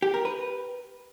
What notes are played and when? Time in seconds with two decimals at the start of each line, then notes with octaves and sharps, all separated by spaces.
0.02 G4
0.14 A#4
0.25 B4